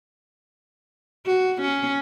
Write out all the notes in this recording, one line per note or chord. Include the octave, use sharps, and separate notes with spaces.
F#4
C#4